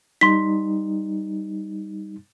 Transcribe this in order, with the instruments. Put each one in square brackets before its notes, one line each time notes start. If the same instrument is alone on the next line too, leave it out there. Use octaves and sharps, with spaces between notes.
[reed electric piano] G3 D#4 [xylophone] C6 B6